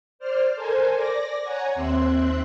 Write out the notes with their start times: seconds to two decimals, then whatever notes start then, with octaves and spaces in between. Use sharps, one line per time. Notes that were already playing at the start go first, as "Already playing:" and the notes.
0.19 C5 D5 F6
0.55 A4 A#4 C5 G#5
0.95 D5 D6 A#6
1.42 C#5 F#5 G#5 A#5 G#6
1.74 D#2 C4 E5 C6 F#6